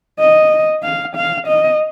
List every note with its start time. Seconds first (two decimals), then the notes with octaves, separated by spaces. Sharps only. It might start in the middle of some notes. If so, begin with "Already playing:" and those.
0.20 D#5
0.83 F5
1.16 F5
1.47 D#5